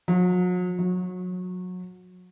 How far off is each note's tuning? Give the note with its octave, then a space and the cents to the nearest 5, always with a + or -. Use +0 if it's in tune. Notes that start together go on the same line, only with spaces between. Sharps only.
F#3 -40
F#3 -25